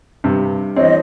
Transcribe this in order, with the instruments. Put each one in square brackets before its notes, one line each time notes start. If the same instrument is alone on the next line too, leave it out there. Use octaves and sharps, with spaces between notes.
[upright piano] G2 [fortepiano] C3
[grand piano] E3 C5 C#5 [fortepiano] C4 [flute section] D#5